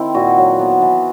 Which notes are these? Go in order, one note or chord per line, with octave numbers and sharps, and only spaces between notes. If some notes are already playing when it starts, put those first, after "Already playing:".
Already playing: D#3 C4 E4
A#2 F#4
F#3
B3
E3